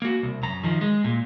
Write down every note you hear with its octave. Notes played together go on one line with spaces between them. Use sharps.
A#3 F#4
C2
F#2 A#5
D#3 F3
G#3
A#2